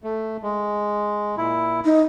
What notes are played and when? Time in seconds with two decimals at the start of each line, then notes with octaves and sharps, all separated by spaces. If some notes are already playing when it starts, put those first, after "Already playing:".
0.04 A3
0.43 G#3
1.38 A#2 E4
1.85 D#4